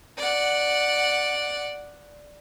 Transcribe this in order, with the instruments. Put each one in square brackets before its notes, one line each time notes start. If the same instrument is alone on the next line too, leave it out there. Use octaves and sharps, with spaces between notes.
[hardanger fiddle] D5 F#5